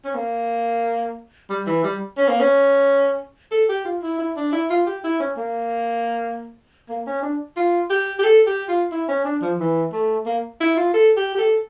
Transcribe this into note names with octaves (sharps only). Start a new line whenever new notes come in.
C#4
A#3
G3
E3
G3
C#4
A#3
C#4
A4
G4
F4
E4
E4
D4
E4
F4
G4
E4
C#4
A#3
A#3
C#4
D4
F4
G4
G4
A4
G4
F4
E4
C#4
D4
F3
E3
A3
A#3
E4
F4
A4
G4
G4
A4